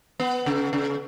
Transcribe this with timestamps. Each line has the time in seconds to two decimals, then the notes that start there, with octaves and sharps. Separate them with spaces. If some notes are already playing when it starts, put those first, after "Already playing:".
0.20 B3
0.46 C#3
0.73 C#3